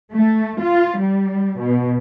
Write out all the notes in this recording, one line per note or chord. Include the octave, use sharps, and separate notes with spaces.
A3
F4
G3
B2